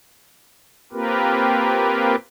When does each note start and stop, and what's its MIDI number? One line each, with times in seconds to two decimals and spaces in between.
0.92 2.15 58
0.92 2.15 60
0.92 2.15 65
0.92 2.15 67
0.92 2.15 70
0.92 2.15 71